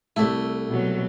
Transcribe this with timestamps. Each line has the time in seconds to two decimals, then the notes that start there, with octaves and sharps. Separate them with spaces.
0.16 C2 A3 E4
0.69 B2 F#3